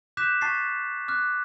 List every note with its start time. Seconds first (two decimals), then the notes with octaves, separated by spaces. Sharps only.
0.17 D6 F#6 G6 B6 E7
0.41 A5 C#6 A6 B6 C7
1.08 D6 F6 F#6